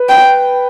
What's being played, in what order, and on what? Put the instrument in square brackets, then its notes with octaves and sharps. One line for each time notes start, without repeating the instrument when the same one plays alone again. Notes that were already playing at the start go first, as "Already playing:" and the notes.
Already playing: [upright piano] B4
[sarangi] G5